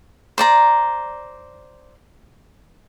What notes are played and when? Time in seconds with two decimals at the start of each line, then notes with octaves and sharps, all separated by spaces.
0.38 C5 D5 A#5